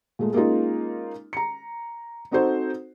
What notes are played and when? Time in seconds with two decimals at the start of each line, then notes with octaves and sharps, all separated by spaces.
0.19 A#2 G#3 A3
0.33 G#3 A#3 C#4 D#4 F4
1.33 A#5 C#7
2.31 C4 D#4 F#4 A4 C5